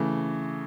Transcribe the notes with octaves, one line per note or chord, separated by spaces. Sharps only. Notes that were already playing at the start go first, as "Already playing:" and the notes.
Already playing: C#3 E3 A3